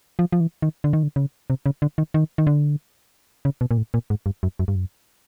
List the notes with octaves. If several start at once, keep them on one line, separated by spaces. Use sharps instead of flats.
F3
F3
E3
D#3
D3
D#3
D3
C#3
C3
C#3
D3
D#3
D#3
D#3
D3
C#3
B2
A#2
A2
A#2
G#2
G2
F#2
F#2
G2
F#2